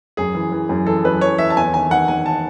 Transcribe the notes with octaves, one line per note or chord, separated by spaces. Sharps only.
F#2 G#4
E3
E3
F#2
E3 A4
F#2 B4
E3 C#5
E3 E5
A5
E2 G#5
D#3 G#5
D#3 F#5
D#3 G#5
A5